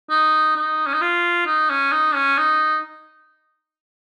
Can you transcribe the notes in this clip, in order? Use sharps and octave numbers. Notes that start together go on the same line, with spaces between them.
D#4
D#4
C#4
D#4
F4
D#4
C#4
D#4
C#4
D#4